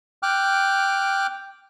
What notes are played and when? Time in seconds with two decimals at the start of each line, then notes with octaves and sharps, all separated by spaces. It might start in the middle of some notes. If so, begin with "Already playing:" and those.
0.23 G5 D6 F6 F#6